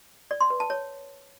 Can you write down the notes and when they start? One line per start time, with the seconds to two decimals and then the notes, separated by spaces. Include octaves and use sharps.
0.31 D5
0.41 C6
0.50 B4
0.60 A5
0.70 C#5